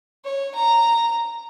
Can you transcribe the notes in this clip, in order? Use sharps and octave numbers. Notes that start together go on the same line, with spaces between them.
C#5
A#5